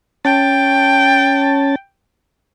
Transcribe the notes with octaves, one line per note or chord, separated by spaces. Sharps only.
C#4 G5 A5